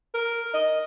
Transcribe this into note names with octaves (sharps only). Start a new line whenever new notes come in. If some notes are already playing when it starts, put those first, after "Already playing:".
A#4
D#5